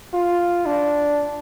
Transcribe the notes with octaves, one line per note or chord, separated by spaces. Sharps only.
F4
D4